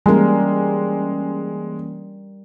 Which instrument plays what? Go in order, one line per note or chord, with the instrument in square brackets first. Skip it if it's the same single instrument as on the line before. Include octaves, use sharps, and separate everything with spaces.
[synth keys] E3 A#3 C#4 [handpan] G3 A#4 [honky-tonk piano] G#3